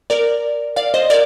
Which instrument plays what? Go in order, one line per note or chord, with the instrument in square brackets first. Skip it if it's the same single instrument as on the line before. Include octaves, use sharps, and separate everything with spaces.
[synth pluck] A#4 D5
D5 F5
C5 D#5
A#4 D5